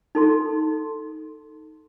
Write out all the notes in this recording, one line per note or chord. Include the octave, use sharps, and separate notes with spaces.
D#4 A4 C6